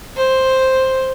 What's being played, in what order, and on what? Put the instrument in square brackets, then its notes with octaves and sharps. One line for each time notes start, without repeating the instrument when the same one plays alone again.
[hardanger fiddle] C5